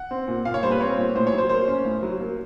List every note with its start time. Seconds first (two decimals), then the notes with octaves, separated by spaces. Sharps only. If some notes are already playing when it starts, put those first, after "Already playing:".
Already playing: F#5
0.11 C4
0.28 A#2
0.45 A#2 F5
0.54 C#5
0.63 G3 C5
0.71 B4
0.80 C4 C#5
0.98 A#2
1.15 A2 C5
1.27 C#5
1.33 F#3
1.38 C5
1.49 A#3 C5
1.68 C#4
1.86 A2
2.03 F#3
2.20 A#3